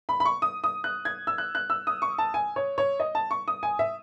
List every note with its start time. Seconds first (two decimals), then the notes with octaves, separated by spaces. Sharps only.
0.09 B5
0.20 B5
0.26 C#6
0.42 D#6
0.64 D#6
0.84 F#6
1.05 G#6
1.27 E6
1.38 F#6
1.55 F#6
1.70 E6
1.87 D#6
2.02 C#6
2.18 A5
2.34 G#5
2.56 C#5
2.78 C#5
3.00 D#5
3.15 A5
3.31 C#6
3.48 D#6
3.63 G#5
3.79 E5